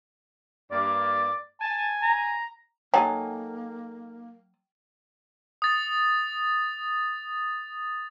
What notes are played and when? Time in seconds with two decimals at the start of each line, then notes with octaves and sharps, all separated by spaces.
0.72 G2 A#3 D5
1.61 G#5 A5
2.02 A#5
2.94 F#3 A#3 D#4 A4 G5 G#5
5.62 D#6 A6